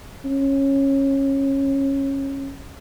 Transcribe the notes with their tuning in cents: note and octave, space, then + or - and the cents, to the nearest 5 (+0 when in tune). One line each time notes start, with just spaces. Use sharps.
C#4 -20